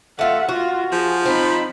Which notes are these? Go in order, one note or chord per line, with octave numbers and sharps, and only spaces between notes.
A3 F4 E5 F#5
F4 F#4
F3 G#4
C4 D#4 B5